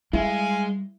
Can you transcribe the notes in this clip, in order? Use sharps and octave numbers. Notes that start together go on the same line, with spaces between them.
G3 G#3 E4 F5 G#5